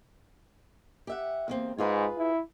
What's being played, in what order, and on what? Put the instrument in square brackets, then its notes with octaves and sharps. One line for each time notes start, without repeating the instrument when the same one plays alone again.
[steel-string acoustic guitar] G4 E5 F#5
E2 A#3 C4
[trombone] G#2 [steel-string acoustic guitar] F4 G#4 B4
[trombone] E4